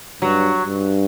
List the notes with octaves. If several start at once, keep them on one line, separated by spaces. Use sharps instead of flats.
G2 F#3
G2